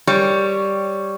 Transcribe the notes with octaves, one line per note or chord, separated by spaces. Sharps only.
G3 C#5